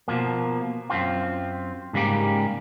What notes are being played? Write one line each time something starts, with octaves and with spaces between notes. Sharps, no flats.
B2 F3 A#3
F#2 C4 F4
G#2 C#3 G3 A#3 G4